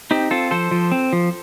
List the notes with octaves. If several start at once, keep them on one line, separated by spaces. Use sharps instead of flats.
C4 D#4 G4
C4 F4 A4
F3 A4 C5
F3
C4
F3